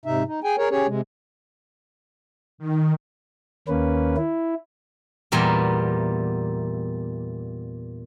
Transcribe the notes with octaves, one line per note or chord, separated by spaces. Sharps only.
G#2 C3 D#4 E5
D#4
G#4 G5 G#5
G#4 A#4 C#5
C#4 G4 G#4 C#5
C3 G#3
D#3
D#2 A#3 C#4 B4
E4
E2 A#2 G3 B3 A#4